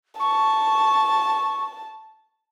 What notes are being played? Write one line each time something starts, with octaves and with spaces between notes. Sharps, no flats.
A5 C#6